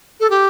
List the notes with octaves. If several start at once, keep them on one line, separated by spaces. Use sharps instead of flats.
A4
G4